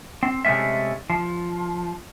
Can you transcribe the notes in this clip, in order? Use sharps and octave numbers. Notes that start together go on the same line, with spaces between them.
C4
C3 G#3 A3 B3 C#4 E5
F3